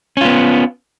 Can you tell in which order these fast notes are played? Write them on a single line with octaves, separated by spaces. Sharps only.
C#4 F4 B3